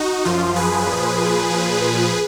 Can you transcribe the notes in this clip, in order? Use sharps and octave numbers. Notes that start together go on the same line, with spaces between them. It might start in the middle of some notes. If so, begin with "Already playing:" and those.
Already playing: D#4 F#4
F#2 F3 F4
G#4 B4
A#2 F3
A#2 F3